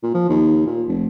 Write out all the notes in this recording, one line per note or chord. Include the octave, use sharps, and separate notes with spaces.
A#2
F3
D#2
A#2
F1